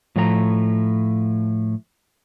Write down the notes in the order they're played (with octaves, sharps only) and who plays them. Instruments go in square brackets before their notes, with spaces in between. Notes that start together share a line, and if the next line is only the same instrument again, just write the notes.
[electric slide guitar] A2 F3 A3 D5 A#5